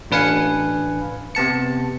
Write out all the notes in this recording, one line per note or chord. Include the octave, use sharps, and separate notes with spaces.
A1 D4 B4 F5 G#5 C#7
C3 B3 A5 C#7